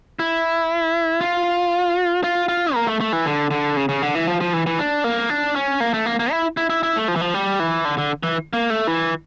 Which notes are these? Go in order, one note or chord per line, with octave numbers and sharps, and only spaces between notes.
E4
F4
F4
F4
A#3
A3
A3
E3
D3
D3
C#3
C#3
D3
E3
F3
F3
E3
E3
D4
A#3
D4
C#4
A#3
A3
A#3
A#3
E4
E4
E4
E4
A3
F3
E3
F3
G3
E3
D3
D3
E3
A#3
A3
E3